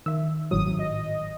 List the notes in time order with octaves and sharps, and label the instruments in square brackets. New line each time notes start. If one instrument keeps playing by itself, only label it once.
[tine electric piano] D#3 [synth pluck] E5 E6
[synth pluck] G#1 A2 F#3 [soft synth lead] D#6
[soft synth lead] D#5